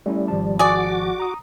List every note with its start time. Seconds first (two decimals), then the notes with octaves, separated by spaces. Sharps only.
0.06 G3 A3 C#4 E4
0.28 G#1 F3 A5
0.59 F#4 G#4 D5 D6
1.20 A#5 D#6